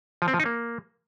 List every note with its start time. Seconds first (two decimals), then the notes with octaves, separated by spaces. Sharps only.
0.22 F3
0.28 C4
0.34 F3
0.40 D#4
0.46 A#3